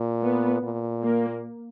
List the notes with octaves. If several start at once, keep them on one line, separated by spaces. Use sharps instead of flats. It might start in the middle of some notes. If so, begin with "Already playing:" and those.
Already playing: A#2
B3
A#2
A#3